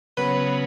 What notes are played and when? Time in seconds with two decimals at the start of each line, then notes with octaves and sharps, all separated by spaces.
0.17 C#3 F#3 B3 B4